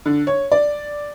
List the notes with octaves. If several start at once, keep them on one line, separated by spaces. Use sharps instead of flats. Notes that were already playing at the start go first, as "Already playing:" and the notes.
D3
C#5
D5